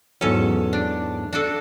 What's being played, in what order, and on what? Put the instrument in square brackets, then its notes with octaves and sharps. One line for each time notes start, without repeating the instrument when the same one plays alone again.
[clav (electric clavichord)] E2 G#2 F#3 [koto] C#4 A4
[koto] D4
D4 F#4 A4